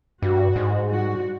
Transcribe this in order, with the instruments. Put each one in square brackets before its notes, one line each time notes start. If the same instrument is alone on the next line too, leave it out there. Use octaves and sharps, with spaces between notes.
[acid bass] G2 [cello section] F#4
[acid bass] G#2
[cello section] G3 F#4